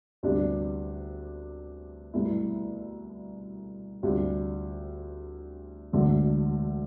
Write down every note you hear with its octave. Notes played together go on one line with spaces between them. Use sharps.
D2 C3 G3 B3 D4
C2 B2 A3 E4
D2 C3 G3 D4 F4
E1 D2 D3 A3